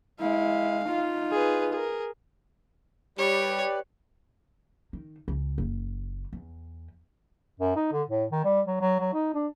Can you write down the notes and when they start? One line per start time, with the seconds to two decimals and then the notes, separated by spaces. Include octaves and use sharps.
0.20 G#3 E4 F5
0.84 D#4 F4
1.31 G#4 B4
1.73 G#4 A#4
3.18 G3 G4 B4 C#5 D5
4.93 D#3
5.28 C#2
5.58 F#1
6.33 E2
7.60 F#2
7.76 D#4
7.92 D3
8.09 A2
8.30 D#3
8.44 G3
8.66 F#3
8.81 F#3
9.00 F#3
9.14 D#4
9.34 D4